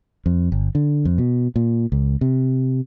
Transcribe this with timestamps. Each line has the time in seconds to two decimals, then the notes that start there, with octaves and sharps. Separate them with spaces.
0.26 F2
0.52 G1
0.75 D3
1.05 F2
1.18 B2
1.56 A#2
1.92 C#2
2.21 C3